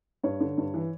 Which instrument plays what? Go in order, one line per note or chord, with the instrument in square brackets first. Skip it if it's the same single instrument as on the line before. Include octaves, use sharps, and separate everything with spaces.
[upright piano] G2 C#5
D3
G2
E3